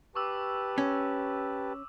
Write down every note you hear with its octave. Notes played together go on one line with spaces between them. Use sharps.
G4 B4 A5 C#6 D6 E6
C#4